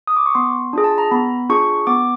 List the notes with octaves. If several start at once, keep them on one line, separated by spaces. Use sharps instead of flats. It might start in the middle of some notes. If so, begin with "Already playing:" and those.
D#6
D6
C#6
B3 C6
D4 F4 G#4
A5
A#5
B3 B5
D4 F4 G#4 C#6
B3 D6